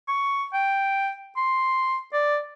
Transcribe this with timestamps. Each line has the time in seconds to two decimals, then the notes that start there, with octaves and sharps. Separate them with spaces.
0.08 C#6
0.53 G5
1.37 C6
2.13 D5